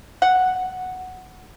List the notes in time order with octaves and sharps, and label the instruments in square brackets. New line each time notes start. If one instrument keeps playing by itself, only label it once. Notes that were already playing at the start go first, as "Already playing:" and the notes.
[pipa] F#5